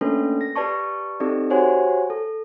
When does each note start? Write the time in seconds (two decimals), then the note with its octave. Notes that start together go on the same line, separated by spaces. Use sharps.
0.01 A3 A#3 C#4 D4 A4 B4
0.41 A#6
0.56 G4 B4 D5 A5 C#6
1.20 C4 D#4 G4 A4 D5
1.50 F#4 G4 C5 C#5 F#5 G#5
2.10 A4